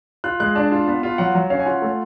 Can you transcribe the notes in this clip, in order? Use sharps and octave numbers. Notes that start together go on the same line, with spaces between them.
F4 F#6
G#3 F#6
D4 A5
F4
B3
F4
F#3 F#5
F#3
C#4 F5
G#5
F4 F#5
A3